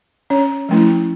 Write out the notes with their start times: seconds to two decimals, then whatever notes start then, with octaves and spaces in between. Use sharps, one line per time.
0.30 C#4 C#5
0.69 F3 A3 C#4 E4